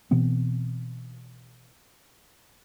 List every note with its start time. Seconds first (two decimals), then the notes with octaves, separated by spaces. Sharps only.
0.11 B2 E3 B3 C4